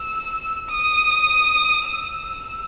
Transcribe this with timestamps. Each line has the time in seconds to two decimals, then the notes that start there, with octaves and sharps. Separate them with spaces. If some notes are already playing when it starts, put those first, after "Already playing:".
Already playing: E6
0.69 D#6
1.87 E6